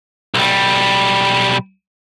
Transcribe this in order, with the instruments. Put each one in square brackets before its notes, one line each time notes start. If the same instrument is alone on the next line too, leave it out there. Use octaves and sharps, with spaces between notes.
[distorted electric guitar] B1 G3